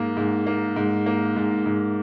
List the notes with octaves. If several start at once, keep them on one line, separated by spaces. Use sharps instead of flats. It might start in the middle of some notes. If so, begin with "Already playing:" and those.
Already playing: G#2 A#3
G#2
A#3
G#2
A#3
G#2
G#2